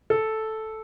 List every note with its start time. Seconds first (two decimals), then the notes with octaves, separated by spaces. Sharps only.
0.10 A4